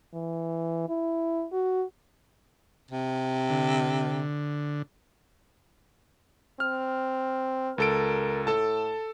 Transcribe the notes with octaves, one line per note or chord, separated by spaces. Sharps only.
E3
E4
F#4
C3
D3
C4 F6
C#2 A4 A#4 D7
A2 A4 A5